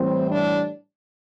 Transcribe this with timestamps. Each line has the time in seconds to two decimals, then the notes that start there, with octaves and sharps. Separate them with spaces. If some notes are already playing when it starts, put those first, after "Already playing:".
Already playing: A2 E3 G3 C4
0.28 D4